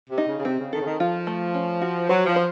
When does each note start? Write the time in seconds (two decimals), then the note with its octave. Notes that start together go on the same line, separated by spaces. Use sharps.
0.10 C3
0.18 D#4
0.27 C#3
0.39 C#3
0.45 C3 C4
0.59 C#3
0.73 D#3 A4
0.82 C#3
0.86 D#3
1.00 F3 F4
1.27 A3
1.54 C#4
1.82 F#4
2.09 F#3 C5
2.26 F3
2.36 C5